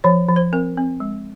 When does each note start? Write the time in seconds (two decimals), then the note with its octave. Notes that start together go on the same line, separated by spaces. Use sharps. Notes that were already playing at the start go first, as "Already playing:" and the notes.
0.04 F3 C#5
0.28 F3
0.36 C5
0.53 C4 A#4
0.77 C4
1.00 G#3